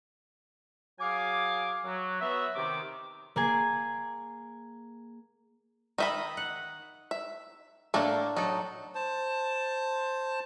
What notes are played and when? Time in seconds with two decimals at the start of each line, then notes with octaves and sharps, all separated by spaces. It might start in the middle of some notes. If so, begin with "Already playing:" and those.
0.99 F#3 G#4 F5 G#5 D6
1.84 F#3
2.20 B3 F#4 C#5 E5
2.55 C3 D#3 D6
3.36 A#3 G#4 G#5
5.98 D#3 D#4 D#5 E5 B5
6.37 F#5
7.11 E5
7.94 A2 A3 A#3 D4 A4
8.36 F#3 D#4 A4
8.95 C5 A5